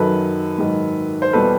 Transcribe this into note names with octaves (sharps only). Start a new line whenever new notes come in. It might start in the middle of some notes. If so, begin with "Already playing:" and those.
Already playing: F#2 D#3 F#3 A4 B4
G#2 D#3 F#3
C5
E2 B2 G3 A4 B4